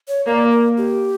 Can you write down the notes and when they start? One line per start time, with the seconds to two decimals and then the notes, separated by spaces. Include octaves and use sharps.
0.08 C#5
0.26 A#3 D5
0.51 A#4
0.77 G4